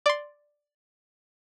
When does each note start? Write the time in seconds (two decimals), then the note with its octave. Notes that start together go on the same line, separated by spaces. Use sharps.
0.06 D5 C6